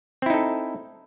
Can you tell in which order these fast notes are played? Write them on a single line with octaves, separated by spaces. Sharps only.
C4 E4 D#4 A4